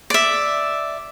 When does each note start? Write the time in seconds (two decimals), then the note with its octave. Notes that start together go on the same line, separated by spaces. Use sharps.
0.10 D5 E5